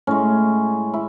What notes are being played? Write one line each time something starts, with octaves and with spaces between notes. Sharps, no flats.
A2 G#3 C#4
E4